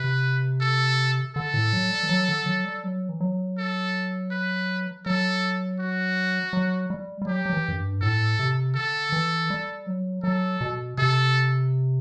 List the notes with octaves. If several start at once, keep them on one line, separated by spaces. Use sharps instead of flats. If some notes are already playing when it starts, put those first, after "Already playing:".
Already playing: C3 B4
A4
D3 A4
A2
F#3
G3
E3
F#3
D3
F#3
G3
F#3
E3
F#3
A4
B4
F#3 A4
F#4
F#3
G3
G3
F#3 G4
F#3
E3
F#2
G2
A2 A4
C3
D3 A4
E3
G3
F#3
F#3 A4
B2
C3 A4